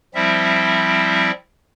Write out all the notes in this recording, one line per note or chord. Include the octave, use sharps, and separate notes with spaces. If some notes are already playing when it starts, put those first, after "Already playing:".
F3 G3 C4 E4 E5